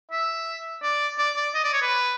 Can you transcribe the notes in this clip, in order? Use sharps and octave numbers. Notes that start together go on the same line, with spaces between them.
E5
D5
D5
D5
D#5
D5
C#5
B4